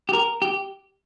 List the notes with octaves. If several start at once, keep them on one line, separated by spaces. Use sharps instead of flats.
G4
A#4
G4